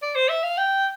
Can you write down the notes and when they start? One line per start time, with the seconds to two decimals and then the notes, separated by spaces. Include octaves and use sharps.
0.02 D5
0.15 C5
0.29 E5
0.43 F5
0.58 G5